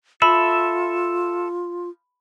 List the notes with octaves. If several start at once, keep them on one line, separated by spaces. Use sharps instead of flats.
F4 A4 E5 B5